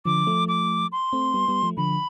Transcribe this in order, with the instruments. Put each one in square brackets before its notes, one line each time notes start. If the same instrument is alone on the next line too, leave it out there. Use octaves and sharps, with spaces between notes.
[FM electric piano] D3 F3 [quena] D6
[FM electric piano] F3 A3
[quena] D6
C6
[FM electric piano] A3 C4
G3 B3
G3 B3
F3 A3
[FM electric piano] D3 F3 [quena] B5